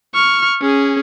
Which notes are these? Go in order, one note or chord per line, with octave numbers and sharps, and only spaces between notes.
C#6 F6
C#4 G#4